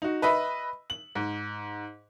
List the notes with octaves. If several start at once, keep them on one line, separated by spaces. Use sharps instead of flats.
D#4 F#4
B4 D#5 E5 B5
F#7
G#2